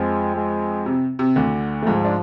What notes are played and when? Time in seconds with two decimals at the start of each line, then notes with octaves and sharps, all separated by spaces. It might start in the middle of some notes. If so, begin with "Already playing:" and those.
Already playing: F2 F3 G#3
0.36 G#3
0.86 C3
1.19 C3
1.36 D2 D3
1.82 A3
1.86 G#2 F3 G#3
2.05 D4